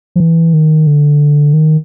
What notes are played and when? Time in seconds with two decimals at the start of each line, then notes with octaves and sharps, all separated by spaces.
0.16 F3
0.20 E3
0.54 D#3
0.87 D3
1.54 D#3